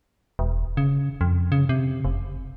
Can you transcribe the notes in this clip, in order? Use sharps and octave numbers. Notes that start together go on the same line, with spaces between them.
E1
C#3
F2
C#3
C3
F1